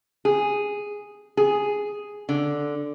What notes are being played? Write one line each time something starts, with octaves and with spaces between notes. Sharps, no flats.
G#4
G#4
D3